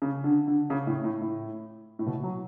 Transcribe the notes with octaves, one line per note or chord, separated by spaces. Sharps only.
C#3
D3
D3
C#3
A2
A2
A2
A2
B2
F#3